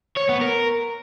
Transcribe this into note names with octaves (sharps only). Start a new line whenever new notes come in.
C#5
B3
A#4